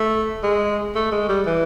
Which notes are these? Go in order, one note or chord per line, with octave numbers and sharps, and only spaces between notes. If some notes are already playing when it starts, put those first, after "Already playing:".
Already playing: A3
G#3
A3
G#3
G3
E3